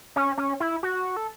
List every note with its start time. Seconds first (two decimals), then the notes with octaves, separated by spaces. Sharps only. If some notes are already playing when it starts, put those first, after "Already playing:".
0.16 C#4
0.37 C#4
0.60 E4
0.83 F#4
1.17 A4